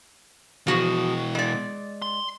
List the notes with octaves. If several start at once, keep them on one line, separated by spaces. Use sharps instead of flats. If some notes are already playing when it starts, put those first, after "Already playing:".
B2 E3 F3 F#4 G#4
G#3 D5
C6